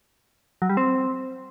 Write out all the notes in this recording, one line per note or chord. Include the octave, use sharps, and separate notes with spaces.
F#3
G3
C4